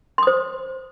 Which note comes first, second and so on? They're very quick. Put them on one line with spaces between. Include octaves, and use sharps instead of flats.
C6 D#6 C5